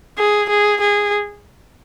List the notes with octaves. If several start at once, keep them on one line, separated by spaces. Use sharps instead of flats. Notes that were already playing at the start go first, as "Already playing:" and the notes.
G#4
G#4
G#4